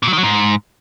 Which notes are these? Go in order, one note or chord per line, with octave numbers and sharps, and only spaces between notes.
A#2
F#3
D#3
F#3
G#2